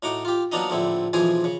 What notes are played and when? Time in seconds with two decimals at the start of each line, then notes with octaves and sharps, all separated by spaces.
0.03 A2 D#4 F#4 D6
0.25 F4 G4
0.52 F#3 A#3 B3 D4 D#4 D#5
0.70 A#1 A2 D3 C4 E4
1.13 B1 E3 F3 G#4 C5 G#5
1.44 C#3